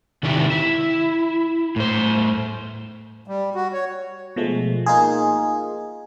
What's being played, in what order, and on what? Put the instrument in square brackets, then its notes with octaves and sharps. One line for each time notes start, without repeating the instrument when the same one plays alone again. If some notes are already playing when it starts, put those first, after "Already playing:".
[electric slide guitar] C3 D#3 D4 E4 G4
E4
A2 C5
[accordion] G3
F#4
C#5
[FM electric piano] B2 F3 G#3 A3
A#3 D#4 F4 G#4